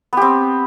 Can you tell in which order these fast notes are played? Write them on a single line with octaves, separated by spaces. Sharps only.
B3 G4 C4